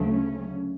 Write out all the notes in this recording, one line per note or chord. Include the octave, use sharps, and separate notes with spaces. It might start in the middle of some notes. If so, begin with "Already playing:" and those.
Already playing: D2 C#3 F#3 A3
C#4